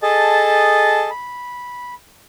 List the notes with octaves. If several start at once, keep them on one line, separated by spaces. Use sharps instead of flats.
G#4 A4 D#5 A5
B5